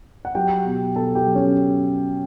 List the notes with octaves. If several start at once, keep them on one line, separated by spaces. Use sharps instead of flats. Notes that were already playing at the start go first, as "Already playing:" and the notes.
F#5
F#3 G4 G5
B2
B2 A4 A5
G4 G5
F#3
C#4 C#5